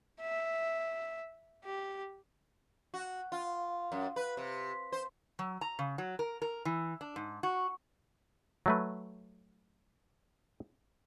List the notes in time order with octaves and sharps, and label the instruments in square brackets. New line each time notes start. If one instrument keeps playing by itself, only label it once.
[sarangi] E5
G4
[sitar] F#4
F4
F#2
B4
C3
C5
[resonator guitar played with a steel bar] F#3
A#5
C#3
F#3
A#4
A#4
E3
D4
G#2
F#4
[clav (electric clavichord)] F#3 A3 B4